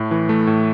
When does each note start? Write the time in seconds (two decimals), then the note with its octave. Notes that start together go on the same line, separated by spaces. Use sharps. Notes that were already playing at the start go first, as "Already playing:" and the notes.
Already playing: A2 A3
0.11 E3
0.29 A3
0.47 A2